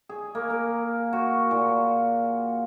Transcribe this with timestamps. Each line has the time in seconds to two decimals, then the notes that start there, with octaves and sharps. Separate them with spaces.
0.09 G#4
0.35 A#3
0.50 A#4
1.13 F#4
1.51 A#2